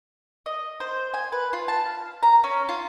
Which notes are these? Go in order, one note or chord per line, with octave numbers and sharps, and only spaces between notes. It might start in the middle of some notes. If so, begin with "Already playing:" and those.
D#5
C5
G#5
B4
F4
A5
F5
A#5
C#4
F4